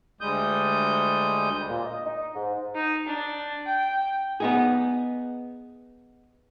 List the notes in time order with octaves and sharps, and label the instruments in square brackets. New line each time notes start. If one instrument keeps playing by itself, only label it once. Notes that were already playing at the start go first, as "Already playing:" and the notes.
[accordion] D2 G3 G#3 D#6 G6
[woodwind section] A#2
D#5
D#4
G#2
[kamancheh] D#4
D4
G5
[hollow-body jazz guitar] B3 D#4 G#4